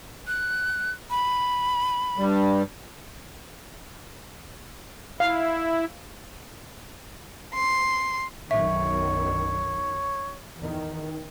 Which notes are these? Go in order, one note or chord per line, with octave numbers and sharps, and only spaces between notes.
F#6
B5
G2 G3
E4 F5
C6
B1 F#2 D#3 C#5 E5
E2 D#3